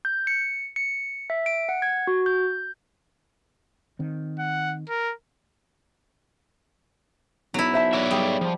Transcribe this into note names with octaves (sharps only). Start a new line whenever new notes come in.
G6
C#7
C#7
E5
D7
F#5
G#6
F#4
G6
D#3 C4
F#5
A#4
B1 F#3 E4
C5 E5 A5
F#4 C#5 D5 E5
G3 G#4
F3